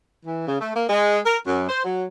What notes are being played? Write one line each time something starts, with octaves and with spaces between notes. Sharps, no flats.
E3
C#3
A3
A#3
G#3
A#4
F#2
C5
F#3